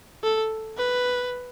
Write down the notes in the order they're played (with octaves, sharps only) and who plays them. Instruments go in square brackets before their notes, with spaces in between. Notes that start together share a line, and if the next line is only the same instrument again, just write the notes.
[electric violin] A4
B4